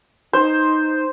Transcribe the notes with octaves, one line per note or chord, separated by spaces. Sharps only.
D#4 C5